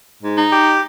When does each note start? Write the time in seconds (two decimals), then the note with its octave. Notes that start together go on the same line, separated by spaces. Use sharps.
0.23 G#2
0.37 D#4
0.52 G4